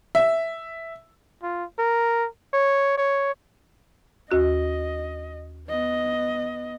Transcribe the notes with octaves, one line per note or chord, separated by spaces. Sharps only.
E5
F4
A#4
C#5
C#5
D#2 F#4 D#5 F#6
B3 D#5